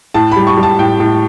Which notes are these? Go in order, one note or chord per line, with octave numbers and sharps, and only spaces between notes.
A2 A5
G3 B5
C#6
G3
A5
A2 G5
A2